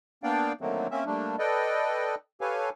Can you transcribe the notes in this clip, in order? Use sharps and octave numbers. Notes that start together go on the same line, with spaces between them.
A#3 B3 D4 D5 F5 G5
D3 D#3 F#3 A3 A#3 C4
A#3 C4 C#4 E5
G3 A3 A#3 D4
A4 B4 D5 D#5 G5
G4 A4 B4 C#5 F5 G#5